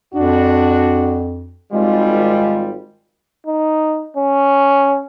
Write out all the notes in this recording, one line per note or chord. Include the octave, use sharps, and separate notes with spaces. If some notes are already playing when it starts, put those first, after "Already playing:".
F2 D4 F#4
G#1 G3 G#3 F4
D#4
C#4